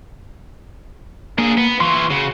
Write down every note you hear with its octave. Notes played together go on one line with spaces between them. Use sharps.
A#3 D4 G#4
B3
E3 F4 C6 C#6
C#3 F#4